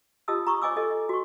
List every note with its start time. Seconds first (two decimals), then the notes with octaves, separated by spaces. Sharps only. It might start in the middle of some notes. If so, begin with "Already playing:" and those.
0.28 F4 G4 D#5 A5 D#6 E6
0.47 A#5 C#6 D#6
0.62 C#5 D#5 G#5 D6 E6
0.77 A4 D#5
0.91 D#5
1.09 F#4 C#6